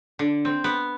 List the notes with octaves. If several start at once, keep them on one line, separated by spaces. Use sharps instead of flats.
D3
C4
B3